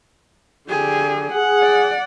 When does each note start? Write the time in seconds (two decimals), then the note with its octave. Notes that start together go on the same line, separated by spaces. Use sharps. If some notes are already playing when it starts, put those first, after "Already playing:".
0.70 D3 G4 G#4
1.33 G#4 F#5
1.63 D5